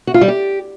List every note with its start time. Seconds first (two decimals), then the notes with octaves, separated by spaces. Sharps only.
0.07 F#4
0.14 F4
0.21 G3
0.28 G4